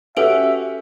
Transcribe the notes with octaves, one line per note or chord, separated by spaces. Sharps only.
C#4 F#4 G4 A4 B4 E5 D7